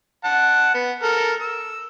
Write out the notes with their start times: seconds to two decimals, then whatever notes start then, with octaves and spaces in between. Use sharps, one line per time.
0.24 F#5 A5
0.74 B3
1.03 A4 A#4
1.41 E6